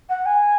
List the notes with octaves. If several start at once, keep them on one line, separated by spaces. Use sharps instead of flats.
F#5
G#5